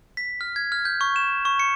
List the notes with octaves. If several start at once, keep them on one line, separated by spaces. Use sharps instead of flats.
B6
F6
G#6
F6
G6
C#6
E7
C#6
C#7